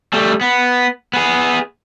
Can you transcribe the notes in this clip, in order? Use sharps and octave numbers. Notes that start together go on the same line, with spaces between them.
G3 A3
B3
B3 G#4